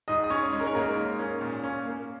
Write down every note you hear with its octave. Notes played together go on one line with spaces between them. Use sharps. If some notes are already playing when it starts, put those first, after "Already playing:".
G#2 D#5 D#6
D#6
C#4 C#5 C#6
G#3 C#5
A#4
C#4 C#5
G#2 A#3 A#4
G#2
C#4
A#2
C#4
A#3